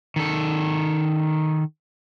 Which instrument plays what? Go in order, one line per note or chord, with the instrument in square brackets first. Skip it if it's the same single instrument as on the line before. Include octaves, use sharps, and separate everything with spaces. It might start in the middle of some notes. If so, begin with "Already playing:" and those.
[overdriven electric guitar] D#3 A4